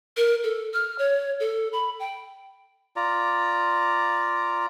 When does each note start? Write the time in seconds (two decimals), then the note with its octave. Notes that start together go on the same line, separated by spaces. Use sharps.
0.17 A#4
0.43 A4
0.74 F6
0.99 C#5
1.40 A4
1.73 B5
2.00 G5
2.96 F4 D5 A#5